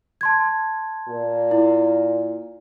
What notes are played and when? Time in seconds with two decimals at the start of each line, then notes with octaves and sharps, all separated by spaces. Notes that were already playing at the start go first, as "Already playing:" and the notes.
0.21 A5 C6 G#6
1.08 A#2
1.51 E4